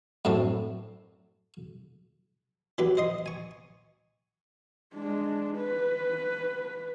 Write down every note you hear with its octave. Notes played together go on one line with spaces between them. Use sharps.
F#2 A2 C4 D4
E3 F#3 G4 B4
C5 D#5 C6
G#5 C#6
G#3 D4
B4